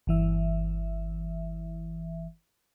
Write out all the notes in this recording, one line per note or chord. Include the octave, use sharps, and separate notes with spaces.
G1 E3 E5